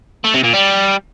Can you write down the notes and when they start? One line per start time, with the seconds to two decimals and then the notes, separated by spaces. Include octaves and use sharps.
0.24 A3
0.34 C3
0.44 A#2
0.54 G3